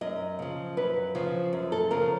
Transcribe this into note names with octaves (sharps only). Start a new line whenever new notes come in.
F#2 D#5
C#3 F3
F#2 B4
C#3 F3
F#2
A4
C#3 F3 A#4